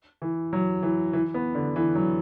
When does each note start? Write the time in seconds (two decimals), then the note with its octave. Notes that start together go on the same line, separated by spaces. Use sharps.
0.22 E3
0.53 F#3
0.83 E3
1.13 E3
1.34 B3
1.55 D3
1.76 E3
1.95 F#3